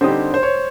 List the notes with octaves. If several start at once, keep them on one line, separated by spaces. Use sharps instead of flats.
D3 G3 C4 D#4 G4 C5
C5
C#5